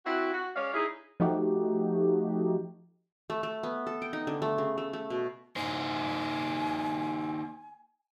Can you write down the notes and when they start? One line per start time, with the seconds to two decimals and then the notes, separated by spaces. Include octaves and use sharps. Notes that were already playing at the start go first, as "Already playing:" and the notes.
0.05 C4 E4 F#4
0.34 F#4
0.56 G#3 C#4 C#5 D5 F5
0.74 D#4 E4 G#4
1.20 F3 A3 D#4 F#4 G4
3.30 A3
3.43 A3
3.63 B3
3.87 A4
4.02 G5
4.13 D#4
4.27 D3
4.42 A3
4.58 C#3
4.78 A3
4.93 A3
5.10 B2
5.56 A#3 D#4 C5 G#5